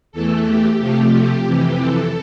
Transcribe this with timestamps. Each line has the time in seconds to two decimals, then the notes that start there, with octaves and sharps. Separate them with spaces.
0.12 E2 E3 A3 A4
0.46 G4
0.79 C3 F3 A3 G4
1.46 F2 C3 E3
1.80 A4